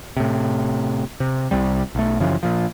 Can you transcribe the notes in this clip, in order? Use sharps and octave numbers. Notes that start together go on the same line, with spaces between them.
A2 C3
C3
C2 C3 G3
B1 A3
F#2 C#3 E3 F3
A#2 F3